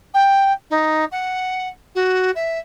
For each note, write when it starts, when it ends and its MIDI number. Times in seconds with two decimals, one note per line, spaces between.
0.14 0.53 79
0.70 1.05 63
1.12 1.68 78
1.95 2.31 66
2.35 2.59 76